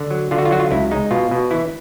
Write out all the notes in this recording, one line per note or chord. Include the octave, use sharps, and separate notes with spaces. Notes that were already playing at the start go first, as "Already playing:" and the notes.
Already playing: D3
F#3
D3 F4
F#4
F4
F#3 F#4
F4
C#2 E4
G#3 D#4
B2 F4
B2
E3 E4